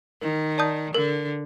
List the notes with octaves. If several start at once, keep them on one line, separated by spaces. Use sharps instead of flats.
D#3 A#4
D5 A5 D#6 G6
D3 A#4